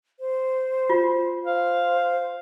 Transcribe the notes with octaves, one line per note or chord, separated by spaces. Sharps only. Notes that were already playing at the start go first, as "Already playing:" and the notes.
C5
F4
C5 F5